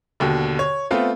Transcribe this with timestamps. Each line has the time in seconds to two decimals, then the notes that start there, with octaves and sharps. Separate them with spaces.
0.20 D#2 B2 D3
0.59 C#5
0.91 A3 B3 C4 F4